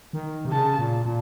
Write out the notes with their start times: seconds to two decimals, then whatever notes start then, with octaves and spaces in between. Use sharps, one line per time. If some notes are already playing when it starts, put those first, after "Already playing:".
0.13 D#3
0.45 C3
0.52 C#3 A5
0.79 A#2
1.05 A#2